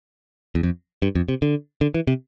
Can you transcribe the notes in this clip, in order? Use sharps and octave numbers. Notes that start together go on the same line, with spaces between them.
E2
F2
G2
F2
C3
D3
D3
E3
C3